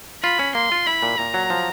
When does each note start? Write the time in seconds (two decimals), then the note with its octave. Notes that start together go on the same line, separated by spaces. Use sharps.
0.23 F4 B5
0.39 C#4
0.55 A#3 C6
0.72 F4
0.87 E4 B5
1.03 A#2
1.18 A#2 A#5
1.34 F#3
1.50 F3